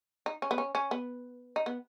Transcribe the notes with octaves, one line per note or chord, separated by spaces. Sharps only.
D#4
C#4
B3
C#4
C#4
B3
D#4
B3